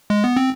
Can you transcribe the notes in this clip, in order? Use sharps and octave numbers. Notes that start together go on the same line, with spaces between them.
G#3
B3
C4